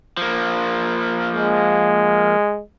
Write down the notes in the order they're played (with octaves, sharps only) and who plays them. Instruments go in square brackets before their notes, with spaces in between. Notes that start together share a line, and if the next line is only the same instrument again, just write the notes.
[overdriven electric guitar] F3 A#3
[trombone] G#3